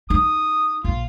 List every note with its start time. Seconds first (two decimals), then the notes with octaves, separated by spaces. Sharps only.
0.10 D#4 D#6
0.84 A#1 F4